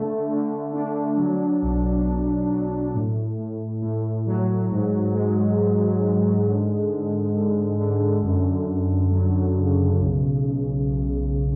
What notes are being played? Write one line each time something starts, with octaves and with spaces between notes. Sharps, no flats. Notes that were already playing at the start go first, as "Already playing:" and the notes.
Already playing: D3 A3
D3
D4
F#3
B1
B1
F#3
A2
A2
A2
F#3
G#2
G#3
G#2
G#3
D3
D3
D3
D3
F#2
F#2
F#3
C#3
B1
B1
B1